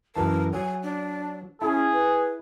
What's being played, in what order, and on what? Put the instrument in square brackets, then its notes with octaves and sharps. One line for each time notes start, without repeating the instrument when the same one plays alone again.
[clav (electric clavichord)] F#2 E3 A5 [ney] A#4
[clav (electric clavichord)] F#3 [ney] G#5
[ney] D4
[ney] C#4 [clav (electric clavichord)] E4 [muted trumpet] G#4
[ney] B4